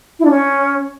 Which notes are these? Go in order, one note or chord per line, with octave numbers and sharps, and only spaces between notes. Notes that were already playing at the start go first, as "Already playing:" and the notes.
E4
D4
C#4